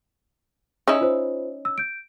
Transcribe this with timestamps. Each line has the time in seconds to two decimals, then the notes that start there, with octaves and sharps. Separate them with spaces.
0.88 C#4 D#4 E4
1.01 F4 C5
1.65 E6
1.78 G6 D7